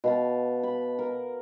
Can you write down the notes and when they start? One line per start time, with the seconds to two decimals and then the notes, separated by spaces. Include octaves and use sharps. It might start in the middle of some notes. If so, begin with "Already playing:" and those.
0.04 B2 F5 A5
0.63 B5
0.99 A#4